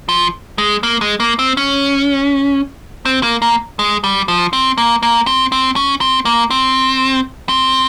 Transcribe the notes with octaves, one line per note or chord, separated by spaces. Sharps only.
F3
G#3
A#3
G#3
A#3
C4
C#4
C4
A#3
A#3
G#3
G3
F3
C4
A#3
A#3
C4
C4
C#4
C4
A#3
C4
C4